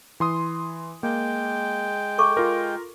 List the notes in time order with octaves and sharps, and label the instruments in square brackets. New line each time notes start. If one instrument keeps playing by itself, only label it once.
[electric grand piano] E3 C6 D#6
[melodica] G#3 G5 [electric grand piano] A#3
[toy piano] A4 C#6 D6
[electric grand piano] F4 A#4